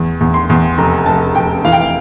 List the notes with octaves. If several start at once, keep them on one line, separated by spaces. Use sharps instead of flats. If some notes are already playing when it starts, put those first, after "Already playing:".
Already playing: E2
E2
C6
E2
F1 A#5
F1 A5
F1 G5
E3 F5
G5
F5